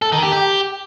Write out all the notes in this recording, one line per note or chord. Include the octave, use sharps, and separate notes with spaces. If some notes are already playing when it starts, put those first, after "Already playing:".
A4
D#3
G4
G4